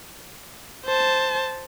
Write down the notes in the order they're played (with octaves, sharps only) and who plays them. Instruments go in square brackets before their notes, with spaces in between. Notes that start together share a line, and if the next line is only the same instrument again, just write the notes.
[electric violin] C5 A5